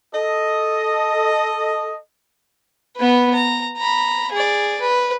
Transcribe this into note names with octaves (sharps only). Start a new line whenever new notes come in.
A4 D#5
B3 B4
A#5
A#5 B5
G#4 D5
B4